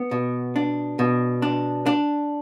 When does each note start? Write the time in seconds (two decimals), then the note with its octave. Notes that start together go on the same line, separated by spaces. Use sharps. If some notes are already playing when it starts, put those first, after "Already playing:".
Already playing: B3
0.11 B2
0.56 D4
0.99 B2
1.42 D4
1.86 D4